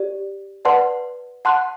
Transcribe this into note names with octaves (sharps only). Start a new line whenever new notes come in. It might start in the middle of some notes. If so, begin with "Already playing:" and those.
Already playing: G4 D5
B4 D5 F#5 A5 C6
F#5 A5 C6 F#6